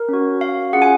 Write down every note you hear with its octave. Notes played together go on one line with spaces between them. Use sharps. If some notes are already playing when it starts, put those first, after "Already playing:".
Already playing: A#4
C#4 F#4
F5
C#4 F4 G#4 F#5
G#5